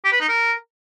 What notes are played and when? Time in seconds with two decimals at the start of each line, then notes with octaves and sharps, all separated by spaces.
0.04 G4
0.13 B4
0.21 D#4
0.29 A#4